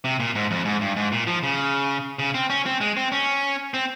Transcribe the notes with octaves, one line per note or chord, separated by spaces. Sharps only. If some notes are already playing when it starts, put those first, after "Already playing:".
C3
A#2
G#2
F2
G#2
G2
G#2
A#2
F3
C#3
C#3
C4
C#4
C4
G#3
C4
C#4
C4